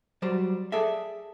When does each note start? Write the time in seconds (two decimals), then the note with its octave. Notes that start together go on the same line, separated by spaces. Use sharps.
0.22 F#3 G3 C5 D5
0.72 G#4 A4 D5 E5